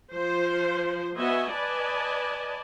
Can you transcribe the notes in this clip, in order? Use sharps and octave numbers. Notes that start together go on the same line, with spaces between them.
F3 C5
B3 F#4 D#5 E5 G#5
B4 D5 D#5 G#5 A5